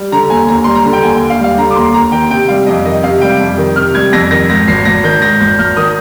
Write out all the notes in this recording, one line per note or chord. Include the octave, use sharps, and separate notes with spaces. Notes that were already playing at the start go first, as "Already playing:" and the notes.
Already playing: G3
D3 A#5
D#2 G#5
D#2 A#5
G3 C6
A#5
D3
G5
D#2 G#5
D#2 G5
F5
G3
F5
D3 A#5
D6
D#2 C6
D#2 A#5
D#3 G5
C3 G5
G3 F5
F2 D#5
D#3 D#5
C3 F5
G3 G5
F2
D#3
C3 F6
G3 G#6
F2 A#6
D#3 A#6
G#2 A#6
G#1 C7
G#1 A#6
D#3 G6
G#2 A#6
G#1 G6
G#1 F6
D#3 D#6